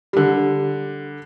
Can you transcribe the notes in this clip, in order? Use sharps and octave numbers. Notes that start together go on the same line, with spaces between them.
D3 G3